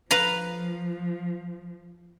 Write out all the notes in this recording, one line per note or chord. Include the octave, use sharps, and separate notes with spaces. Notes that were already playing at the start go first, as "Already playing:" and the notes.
F3 B4 F5 A#5